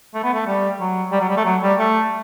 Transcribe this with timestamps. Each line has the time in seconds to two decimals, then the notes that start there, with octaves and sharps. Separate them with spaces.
0.14 A3
0.23 B3
0.34 A3
0.47 G3
0.80 F#3
1.12 G3
1.21 F#3
1.30 G3
1.37 A3
1.45 F#3
1.62 G3
1.79 A3